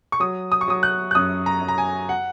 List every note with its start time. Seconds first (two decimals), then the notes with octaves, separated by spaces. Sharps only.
0.12 C#6
0.20 F#3 D#6
0.52 D#6
0.61 C#6
0.68 F#3 D#6
0.83 F#6
1.11 F#6
1.15 F#2 D#6
1.46 A#5
1.61 F#2
1.68 A#5
1.78 G#5
2.09 F#5